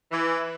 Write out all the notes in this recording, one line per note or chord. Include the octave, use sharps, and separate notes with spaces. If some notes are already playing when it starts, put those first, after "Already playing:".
E3